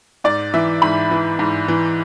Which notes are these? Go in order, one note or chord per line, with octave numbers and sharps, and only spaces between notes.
G#2 D5
E3 E5
G#2 B5
E3
G#2
E3